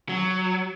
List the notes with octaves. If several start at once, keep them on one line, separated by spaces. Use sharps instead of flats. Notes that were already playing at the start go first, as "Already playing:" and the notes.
F#3